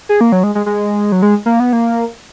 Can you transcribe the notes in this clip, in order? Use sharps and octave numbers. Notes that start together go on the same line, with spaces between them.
G#4
A#3
F#3
G#3
G#3
G#3
F#3
G#3
A#3
B3
A#3